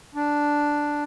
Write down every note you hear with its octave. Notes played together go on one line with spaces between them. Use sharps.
D4